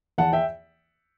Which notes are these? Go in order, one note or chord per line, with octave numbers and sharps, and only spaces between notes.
E2 F#5 A5
E5 G5